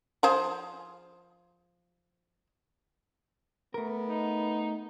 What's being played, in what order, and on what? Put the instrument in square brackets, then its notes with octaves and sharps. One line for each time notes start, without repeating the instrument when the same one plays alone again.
[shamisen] F3 G#4 C5
[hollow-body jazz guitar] A3 A#4 [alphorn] B3
[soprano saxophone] D#4